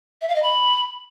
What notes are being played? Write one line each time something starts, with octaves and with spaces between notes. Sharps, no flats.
E5
F5
D#5
B5